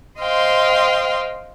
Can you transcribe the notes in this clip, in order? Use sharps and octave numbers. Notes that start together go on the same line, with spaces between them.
C5 D#5 F5 G5 C6